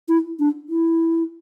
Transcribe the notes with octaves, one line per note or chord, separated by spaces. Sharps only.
E4
D4
E4